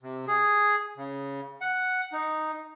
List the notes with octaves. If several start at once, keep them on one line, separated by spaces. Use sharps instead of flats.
C3
G#4
C#3
F#5
D#4